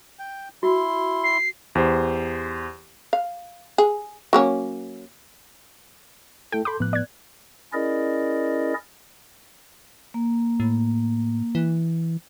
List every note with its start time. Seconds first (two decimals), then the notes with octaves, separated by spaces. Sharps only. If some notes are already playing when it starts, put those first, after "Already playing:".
0.19 G5
0.63 E4 F#4 C6
1.24 C7
1.75 E2 G4 C5
3.13 F5
3.78 G#4
4.33 F#3 A#3 C#4
6.52 A3 E4 A4 G5
6.65 A4 B5 C6 D6 G6
6.80 A2 F3 B3 F#6
6.93 D5 G#6
7.73 C#4 E4 G#4 A#4 D5 D#5
10.14 A#3
10.60 A2
11.55 E3